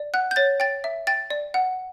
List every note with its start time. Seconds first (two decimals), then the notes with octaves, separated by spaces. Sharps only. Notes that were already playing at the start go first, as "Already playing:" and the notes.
Already playing: D5
0.14 F#5 F#6
0.31 G6
0.36 C#5 A6
0.60 G5 A6
0.84 E5
1.07 G5 A6
1.30 D5
1.54 F#5